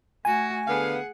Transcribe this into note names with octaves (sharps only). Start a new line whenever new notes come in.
A3 F#4 G#5
D3 B3 G#4 F5 F#5